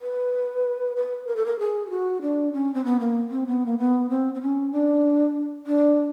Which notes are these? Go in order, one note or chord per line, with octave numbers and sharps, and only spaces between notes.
B4
B4
A#4
A4
A#4
G#4
G4
F#4
D4
C#4
C4
B3
A#3
C4
B3
A#3
B3
C4
C4
C#4
D4
D4